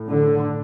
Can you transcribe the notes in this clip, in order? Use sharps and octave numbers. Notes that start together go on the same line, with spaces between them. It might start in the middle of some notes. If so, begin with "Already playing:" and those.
Already playing: A2
D3